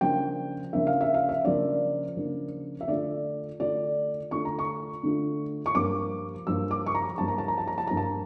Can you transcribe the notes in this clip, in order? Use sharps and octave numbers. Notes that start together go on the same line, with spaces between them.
C#3 F3 A#3 D4 G5
C#3 F3 A#3 D4 E5
F5
E5
F5
E5
C#3 F3 A#3 D4 D5
C#3 F3 A#3 D4
E5
D3 A3 D4 F4 D5
D3 A3 D4 F4 D5
D3 A3 D4 F4 C#6
A#5
C#6
D3 A3 D4 F4
C#6
G2 F3 A#3 D6
G2 F3 A#3 E6
D6
C#6
A#5
G2 F3 A#3 A5
A#5
A5
A#5
A5
A#5
A5
G2 F3 A#3 A#5
A5